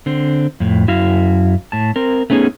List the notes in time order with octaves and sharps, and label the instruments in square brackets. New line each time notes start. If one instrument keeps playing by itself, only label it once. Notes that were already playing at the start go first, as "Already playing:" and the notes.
[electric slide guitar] D3 C4
F2 A2
F#2 E4 F#4 F5
A2 A5
C4 A#4
A3 B3 C#4 D#4 G#4